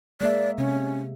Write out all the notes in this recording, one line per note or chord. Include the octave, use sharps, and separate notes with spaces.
G#3 A#3 D5 E5
C3 C#4